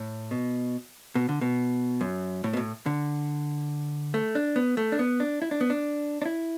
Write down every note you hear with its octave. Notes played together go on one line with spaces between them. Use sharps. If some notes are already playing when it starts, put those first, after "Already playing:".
Already playing: A2
B2
B2
D3
B2
F#2
A2
B2
A2
D3
A3
D4
B3
A3
D4
B3
D4
E4
D4
B3
D4
D4
E4